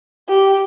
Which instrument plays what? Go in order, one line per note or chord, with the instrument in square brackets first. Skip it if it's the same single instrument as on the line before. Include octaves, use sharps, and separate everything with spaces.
[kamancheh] G4